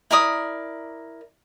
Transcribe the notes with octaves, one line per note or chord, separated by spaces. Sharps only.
E4 A#4 D5 D#6